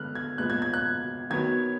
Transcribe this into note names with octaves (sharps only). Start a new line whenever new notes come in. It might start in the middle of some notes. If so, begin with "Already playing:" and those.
Already playing: D3 G#3 B3 F6 F#6
G#6
A#2 G#3 B3 F#6
G#6
G#6
F#6
D#3 F#3 B3 G#6